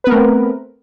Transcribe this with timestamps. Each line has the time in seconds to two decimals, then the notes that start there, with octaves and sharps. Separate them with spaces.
0.04 B4
0.07 B3
0.10 A#4
0.12 A3
0.15 C4